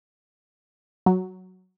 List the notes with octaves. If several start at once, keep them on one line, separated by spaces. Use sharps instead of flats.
F#3